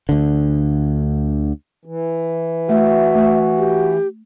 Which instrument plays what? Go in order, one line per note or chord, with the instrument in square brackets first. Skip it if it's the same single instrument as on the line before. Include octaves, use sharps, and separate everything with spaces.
[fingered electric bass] D2 D3
[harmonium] E3
[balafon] A3 [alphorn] F#4 [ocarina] E5
[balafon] A3
[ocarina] G4